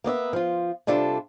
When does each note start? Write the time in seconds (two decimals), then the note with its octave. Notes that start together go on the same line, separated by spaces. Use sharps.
0.04 A#3 B3 D5 E5
0.33 F3 F4
0.87 C3 G3 D4 F4 A4